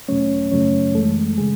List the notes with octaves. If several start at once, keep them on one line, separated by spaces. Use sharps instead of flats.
E2 B2 F#3 A3 C#4 C#5
F#2 C#3 F#3 A3 C#4 C#5
F#2 E3 G#3 A3 A4
C#3 G#3 G#4